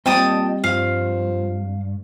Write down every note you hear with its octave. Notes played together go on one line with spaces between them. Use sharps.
A#2 G3 C4 D#5 G5 A5 D#6
G2 F3 F5